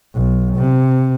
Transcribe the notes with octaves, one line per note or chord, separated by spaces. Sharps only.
B1
C3